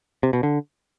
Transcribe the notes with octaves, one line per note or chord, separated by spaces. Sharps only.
C3
B2
D3